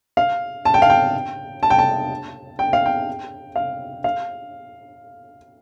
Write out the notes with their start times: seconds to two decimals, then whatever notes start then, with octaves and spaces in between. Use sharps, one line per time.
0.17 F5
0.65 A5
0.74 G5
0.82 F5
0.90 G5
1.63 A5
1.70 G5
1.79 A5
2.59 G5
2.73 F5
2.86 G5
3.56 F5
4.04 F5